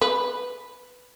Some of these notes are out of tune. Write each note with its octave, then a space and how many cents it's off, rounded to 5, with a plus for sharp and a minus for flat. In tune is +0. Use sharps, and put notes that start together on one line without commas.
B4 +5